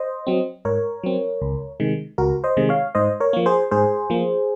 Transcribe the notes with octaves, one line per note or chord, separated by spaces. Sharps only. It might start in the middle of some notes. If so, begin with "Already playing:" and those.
Already playing: C5 D#5
F#3 C4
G#2 A#4 C#5
F#3 C4
C#2
C3 D#3 G#3
C#2 F#4 A#4
C5 D#5
C3 D#3 G#3
C#5 F5
G#2 C5 D#5
A#4 C#5
F3 A#3
G#4 C5
G#2 G#4 C5
F3 A#3